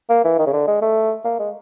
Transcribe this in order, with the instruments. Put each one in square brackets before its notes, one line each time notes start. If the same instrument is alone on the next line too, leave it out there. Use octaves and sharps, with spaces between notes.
[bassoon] A#3
E3
D#3
C#3
D3
G#3
A3
A#3
G#3